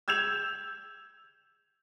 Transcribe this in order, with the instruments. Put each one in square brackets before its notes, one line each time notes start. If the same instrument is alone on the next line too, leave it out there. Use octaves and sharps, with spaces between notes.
[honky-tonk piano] E6 G6 G#6 E7 F7